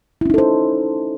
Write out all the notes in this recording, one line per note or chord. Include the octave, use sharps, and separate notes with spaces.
C#4 D#4 E4 A4 C5